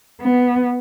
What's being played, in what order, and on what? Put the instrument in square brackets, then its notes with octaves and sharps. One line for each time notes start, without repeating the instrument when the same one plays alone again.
[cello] B3